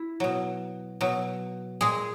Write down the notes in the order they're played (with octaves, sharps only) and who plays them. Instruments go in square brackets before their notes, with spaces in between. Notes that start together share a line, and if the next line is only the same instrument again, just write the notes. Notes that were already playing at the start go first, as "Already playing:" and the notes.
Already playing: [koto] E4
B2 F#3
B2 F#3
A#2 G#3 G#4